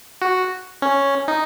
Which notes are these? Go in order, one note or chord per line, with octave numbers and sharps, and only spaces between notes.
F#4
C#4
D#4